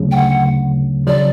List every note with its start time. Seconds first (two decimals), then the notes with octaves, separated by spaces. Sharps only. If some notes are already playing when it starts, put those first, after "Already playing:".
Already playing: D2 C#3 F#3
0.12 G5
0.16 F#5
1.07 C#3 F#3 D5